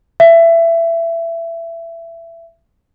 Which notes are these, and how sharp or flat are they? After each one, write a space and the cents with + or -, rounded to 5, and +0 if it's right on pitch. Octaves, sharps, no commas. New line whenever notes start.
E5 +20